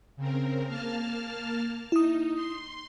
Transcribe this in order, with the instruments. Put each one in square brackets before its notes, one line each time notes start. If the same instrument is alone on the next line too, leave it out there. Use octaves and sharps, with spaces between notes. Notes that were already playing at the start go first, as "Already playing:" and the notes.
[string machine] C#3 C4 A#4
A#3 A5 F6
[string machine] D#4 [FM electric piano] E4 D#6
[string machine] C6